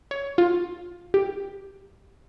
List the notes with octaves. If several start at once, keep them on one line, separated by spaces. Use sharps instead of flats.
C#5
F4
G4